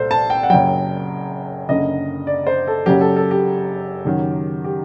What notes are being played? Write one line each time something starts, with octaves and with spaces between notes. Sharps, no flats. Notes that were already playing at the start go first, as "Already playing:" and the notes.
Already playing: C2 A#2 G3 A4 C5
A5
G5
F#5
F#1 F#2 F#3 G5
F#1 F#2 D3 D#5
D5
C5
A4
F#1 F#2 F#3 G4
A4
A4
G4
F#1 F#2 D#3 F#3
G4